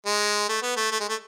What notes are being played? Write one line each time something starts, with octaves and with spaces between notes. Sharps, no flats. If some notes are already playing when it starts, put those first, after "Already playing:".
G#3
A3
B3
A3
A3
G#3
A3